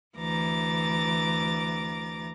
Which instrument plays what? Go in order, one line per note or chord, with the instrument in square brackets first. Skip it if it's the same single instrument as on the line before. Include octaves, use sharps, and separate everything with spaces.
[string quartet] D2 E3 A#5 D6 A6